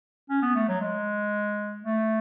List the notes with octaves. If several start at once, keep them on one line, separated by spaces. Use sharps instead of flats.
C#4
B3
A3
F#3
G#3
A3